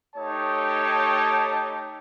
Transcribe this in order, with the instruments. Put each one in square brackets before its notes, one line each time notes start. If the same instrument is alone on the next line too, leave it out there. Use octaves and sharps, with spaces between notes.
[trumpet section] A3 D#4 G4 C#5 A5